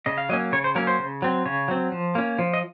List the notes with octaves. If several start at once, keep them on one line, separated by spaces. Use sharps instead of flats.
C#3 D#5
F5
F#3 A#3 C#4 D#5
C#3 C#5
C5
F#3 A#3 C#4 A#4
C5
C#3
F#3 C4
C#3 C#5
F#3 C4
F3
A#3 C#4
F3
D#5